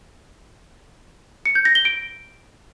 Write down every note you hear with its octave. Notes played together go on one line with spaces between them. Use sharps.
C#7
G6
A#6
G7
D7